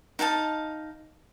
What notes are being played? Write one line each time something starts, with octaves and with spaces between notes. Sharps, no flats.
D#4 F5 F#5 A5